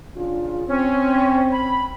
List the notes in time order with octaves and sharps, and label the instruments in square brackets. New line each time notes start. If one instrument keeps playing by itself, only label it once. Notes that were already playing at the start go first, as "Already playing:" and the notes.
[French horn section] C#3 D4 F4
[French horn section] C4 [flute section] C#4
[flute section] B5